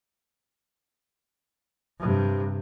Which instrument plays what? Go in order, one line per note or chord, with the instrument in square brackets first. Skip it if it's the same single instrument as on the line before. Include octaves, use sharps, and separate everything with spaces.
[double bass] G2 C3